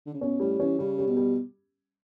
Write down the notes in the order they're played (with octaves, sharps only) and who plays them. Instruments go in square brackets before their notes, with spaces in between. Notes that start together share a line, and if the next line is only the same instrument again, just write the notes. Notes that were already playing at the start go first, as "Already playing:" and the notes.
[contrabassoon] D3
C#3
[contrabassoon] B2 [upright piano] C#4
[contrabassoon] A2 [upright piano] G3
[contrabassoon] E3 [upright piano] C#4
[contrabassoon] C#3 [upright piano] G3
[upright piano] G3
[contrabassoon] B2
[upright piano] G3